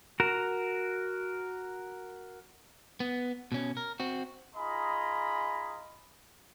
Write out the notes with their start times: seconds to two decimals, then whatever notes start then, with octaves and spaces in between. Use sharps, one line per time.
0.20 F#4 A#4
3.00 B3
3.52 B2 C#4
3.77 A#4
4.00 C4 F#4
4.56 D#4 F4 G#4 D#5 A#5 B5